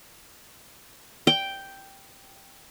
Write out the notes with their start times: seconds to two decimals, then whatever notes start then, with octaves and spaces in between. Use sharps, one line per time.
1.27 G5